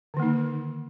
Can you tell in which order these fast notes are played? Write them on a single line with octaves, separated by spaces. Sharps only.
D3 D#3 A#3 D#4